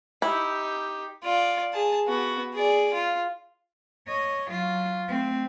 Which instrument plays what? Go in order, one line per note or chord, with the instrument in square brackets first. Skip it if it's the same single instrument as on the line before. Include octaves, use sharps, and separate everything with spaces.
[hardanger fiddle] D#4 G4 [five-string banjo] E4
[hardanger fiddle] F4 D5
G#4 A5
B3 F#4
G#4 D5
F4
[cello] C#5 D#5
F#3 F4
A3 C4